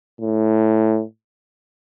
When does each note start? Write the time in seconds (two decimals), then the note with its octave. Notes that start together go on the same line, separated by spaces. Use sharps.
0.21 A2